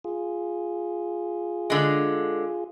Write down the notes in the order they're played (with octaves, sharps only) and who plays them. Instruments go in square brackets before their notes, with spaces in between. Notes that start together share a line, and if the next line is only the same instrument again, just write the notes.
[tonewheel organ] F4 G#4
[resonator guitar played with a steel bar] D3 G#3